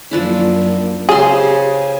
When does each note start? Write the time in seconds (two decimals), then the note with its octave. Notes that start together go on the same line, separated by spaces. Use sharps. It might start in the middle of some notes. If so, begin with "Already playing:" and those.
0.11 F#2 F3 A#3 D4 E4
1.09 C#3 G4 G#4 C5 C6
1.64 G#5